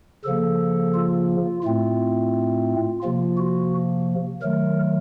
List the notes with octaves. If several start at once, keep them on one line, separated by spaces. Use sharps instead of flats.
C#3 F3 A#3 A4
F4
A2 A3 C4 F4
C3 F3 A#3 F4
F#4
D#3 F#3 A3 A#4